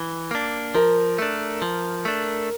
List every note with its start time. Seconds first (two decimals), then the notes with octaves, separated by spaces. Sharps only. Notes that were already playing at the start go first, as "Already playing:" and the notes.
Already playing: E3
0.31 A#3 D4
0.75 F3 A#4
1.18 A3 D4
1.62 F3
2.05 A3 D4